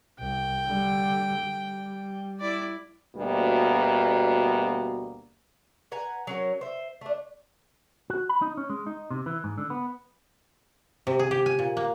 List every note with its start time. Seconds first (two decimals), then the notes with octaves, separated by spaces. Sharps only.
0.19 C2 G5
0.67 D3 G3
1.39 G3
2.40 E4 D5
3.16 D2 B2 G3 A#3
5.92 B4 F#5 G#5 A#5
6.27 F#3 C#4 A#4
6.61 C5 E5
7.01 A3 D4
8.10 F#4
8.29 B5
8.42 D#4
8.57 C#4
8.70 G#3
8.86 D#4
9.11 C3
9.26 E3
9.44 G#2
9.58 D3
9.70 B3
11.07 C3
11.19 G#4
11.31 G4
11.46 G#5
11.59 A#2
11.77 A#3